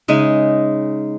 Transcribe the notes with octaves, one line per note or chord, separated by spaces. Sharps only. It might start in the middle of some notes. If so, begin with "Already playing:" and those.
C#3 G#3 D#4 E5